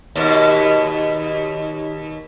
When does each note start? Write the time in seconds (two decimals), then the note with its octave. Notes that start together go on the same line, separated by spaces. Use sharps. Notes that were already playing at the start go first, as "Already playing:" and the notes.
0.16 D#2 B2